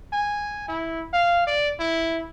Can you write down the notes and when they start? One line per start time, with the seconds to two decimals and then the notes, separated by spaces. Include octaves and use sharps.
0.12 G#5
0.68 E4
1.13 F5
1.47 D5
1.79 E4